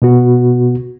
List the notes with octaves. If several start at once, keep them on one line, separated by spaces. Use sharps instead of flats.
B2 B3 F#4